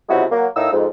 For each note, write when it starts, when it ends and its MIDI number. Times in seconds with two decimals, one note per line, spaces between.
0.09 0.24 37
0.09 0.24 48
0.09 0.24 54
0.09 0.24 56
0.09 0.24 64
0.09 0.24 66
0.31 0.46 54
0.31 0.46 58
0.56 0.70 45
0.56 0.70 63
0.56 0.70 70
0.56 0.70 77
0.56 0.70 88
0.72 0.86 41
0.72 0.86 44